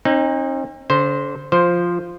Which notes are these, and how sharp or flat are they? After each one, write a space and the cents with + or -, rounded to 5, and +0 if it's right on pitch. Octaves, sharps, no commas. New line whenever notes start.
C4 +45 D#4 -10
D3 -40 C5 +0
F3 +0 C5 +0